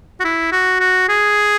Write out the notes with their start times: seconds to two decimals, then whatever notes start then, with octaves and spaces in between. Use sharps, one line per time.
0.20 F#4
0.24 E4
0.52 F#4
0.80 F#4
1.09 G#4